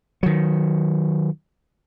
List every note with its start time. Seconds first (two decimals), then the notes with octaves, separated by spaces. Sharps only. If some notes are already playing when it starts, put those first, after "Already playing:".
0.23 D#3 F#3